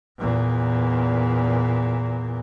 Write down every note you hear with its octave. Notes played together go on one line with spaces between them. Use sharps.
E2 A#2